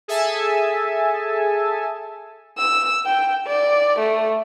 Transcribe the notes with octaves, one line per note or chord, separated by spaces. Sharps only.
G#4 A4 E5 G#5 A5
E6
G5
D5
A3